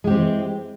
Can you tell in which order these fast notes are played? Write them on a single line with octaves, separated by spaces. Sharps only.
G#3 G4 C4 E3